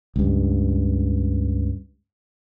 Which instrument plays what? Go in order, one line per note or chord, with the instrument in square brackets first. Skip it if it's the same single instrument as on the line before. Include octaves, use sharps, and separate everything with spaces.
[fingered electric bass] C#2 G2